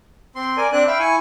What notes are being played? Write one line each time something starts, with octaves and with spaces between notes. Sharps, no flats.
C4 C6
A#4 D5 G#5
C4 D4 D5 F#6
E5 F5 G5 B5
E4 G#5 C#6